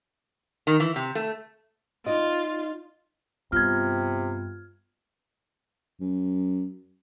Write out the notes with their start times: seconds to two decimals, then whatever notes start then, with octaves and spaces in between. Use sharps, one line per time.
0.67 D#3
0.80 E3
0.96 C3
1.15 A3
2.06 D#4 F4 D5 D#5
3.52 G2 C3 B3 F4 F6 G#6
6.00 F#2